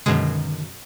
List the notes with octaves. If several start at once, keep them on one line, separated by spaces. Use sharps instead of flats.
F#2 B2 D3 D#3 G#3